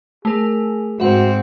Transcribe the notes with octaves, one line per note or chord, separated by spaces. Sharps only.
A3 G#4 A#4
G#2 C4 F#4 E5 F#5